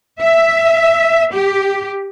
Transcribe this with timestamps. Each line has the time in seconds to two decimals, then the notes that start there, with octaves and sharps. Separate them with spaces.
0.21 E5
1.32 G4